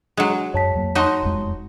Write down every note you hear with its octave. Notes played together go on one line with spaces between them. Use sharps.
F#3 G#3 D4 D#5 C#7
F#2 C#5 A5 B6
F2 F#3 A#3
D#4 F#4 C#5 D#5 A5 C6
E1 F2 G#3